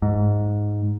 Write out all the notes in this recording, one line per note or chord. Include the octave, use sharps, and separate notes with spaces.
G#2